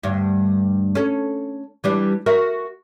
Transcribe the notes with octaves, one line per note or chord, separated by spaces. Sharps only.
D2 G2
C#4 A4
E3 G3 D4
F#4 A#4 E5